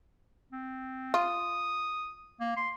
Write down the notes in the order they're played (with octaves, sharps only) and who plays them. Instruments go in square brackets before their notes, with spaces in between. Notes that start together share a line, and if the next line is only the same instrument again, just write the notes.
[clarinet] C4
[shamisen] F4 [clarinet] D#6
[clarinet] A#3
C6